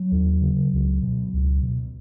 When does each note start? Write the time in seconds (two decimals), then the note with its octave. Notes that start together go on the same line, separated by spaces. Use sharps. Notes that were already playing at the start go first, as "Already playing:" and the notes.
Already playing: F#3
0.11 D#2
0.41 C#3
0.73 C#2
1.03 B2
1.33 C#2
1.63 B2